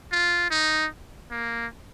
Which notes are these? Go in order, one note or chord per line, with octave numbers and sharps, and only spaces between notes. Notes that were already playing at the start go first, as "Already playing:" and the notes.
F4
D#4
A#3